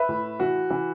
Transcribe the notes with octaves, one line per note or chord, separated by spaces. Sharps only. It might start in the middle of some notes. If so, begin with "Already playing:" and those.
Already playing: B4 E5
A2
E3 F#4
E3